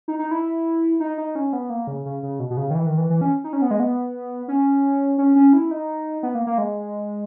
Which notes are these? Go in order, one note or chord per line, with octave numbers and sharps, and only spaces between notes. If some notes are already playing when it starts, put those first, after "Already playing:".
D#4
D#4
E4
D#4
D#4
C#4
B3
A#3
C#3
C#3
C#3
B2
B2
C#3
D#3
E3
D#3
E3
E3
C#4
D#4
C#4
B3
G#3
B3
C#4
C#4
C#4
E4
D#4
B3
A#3
A#3
G#3